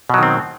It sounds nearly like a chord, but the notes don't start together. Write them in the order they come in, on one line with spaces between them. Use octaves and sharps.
B2 F#3 D#3 C4